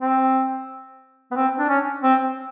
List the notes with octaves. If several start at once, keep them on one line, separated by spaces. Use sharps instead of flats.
C4
B3
C4
D4
C#4
C4